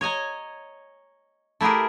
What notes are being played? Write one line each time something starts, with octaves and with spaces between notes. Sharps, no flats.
C#5 D#5 G#5 A#5
A3 E4 G4 G#4 A#4